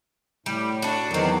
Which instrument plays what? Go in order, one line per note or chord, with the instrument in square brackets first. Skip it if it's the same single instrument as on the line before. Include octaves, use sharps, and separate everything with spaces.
[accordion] A2 [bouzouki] G3
[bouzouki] D4 F#4
[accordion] E2 D#3 F#3 [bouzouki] C4 D4